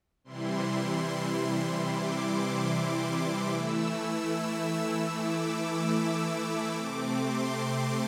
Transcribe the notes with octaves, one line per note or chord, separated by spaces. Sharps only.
C3 E3 G3 E4 C6
D6
E3 A3 E4 E6
D6
C3 A3 C4 D6
C6
C6